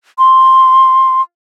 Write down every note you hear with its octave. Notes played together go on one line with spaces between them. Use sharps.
C6